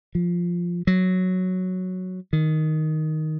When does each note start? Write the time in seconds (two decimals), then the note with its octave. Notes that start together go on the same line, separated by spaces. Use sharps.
0.15 F3
0.87 F#3
2.33 D#3